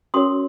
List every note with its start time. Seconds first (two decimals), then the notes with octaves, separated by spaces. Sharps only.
0.14 C#4 F#4 A#4 C#5 C6 D#6